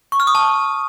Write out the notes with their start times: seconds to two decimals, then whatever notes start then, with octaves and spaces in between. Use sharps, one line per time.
0.12 C#6
0.20 F6
0.27 D#6
0.35 A5